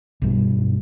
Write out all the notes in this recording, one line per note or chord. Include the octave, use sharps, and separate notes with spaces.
B1 G2